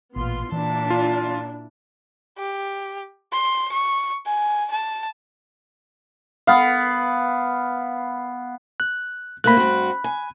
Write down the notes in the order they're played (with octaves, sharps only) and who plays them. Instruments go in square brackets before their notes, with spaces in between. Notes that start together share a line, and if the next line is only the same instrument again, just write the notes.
[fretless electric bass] A1 A#2 [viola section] B3 F4 C6
[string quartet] A#2 A5 [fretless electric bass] E3 [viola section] D4 E4
[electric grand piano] F4
[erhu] G4
C6
C#6
G#5
A5
[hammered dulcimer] B3 F5
[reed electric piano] F#6
[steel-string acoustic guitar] A3 A#3 C4 [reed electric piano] B5 F#6
[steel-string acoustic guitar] G2 C4 F#4
G#5